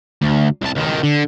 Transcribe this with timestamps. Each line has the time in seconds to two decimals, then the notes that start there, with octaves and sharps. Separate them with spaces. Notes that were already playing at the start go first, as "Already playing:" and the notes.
0.22 D2
0.62 C2 A5
0.75 C#2 D#3
1.03 D3